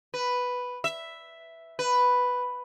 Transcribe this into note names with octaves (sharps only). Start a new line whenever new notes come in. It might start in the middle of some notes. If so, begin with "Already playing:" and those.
B4
E5
B4